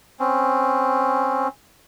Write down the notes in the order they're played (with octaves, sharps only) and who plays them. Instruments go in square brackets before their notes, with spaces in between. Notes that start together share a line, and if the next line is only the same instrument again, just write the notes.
[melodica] C4 C#4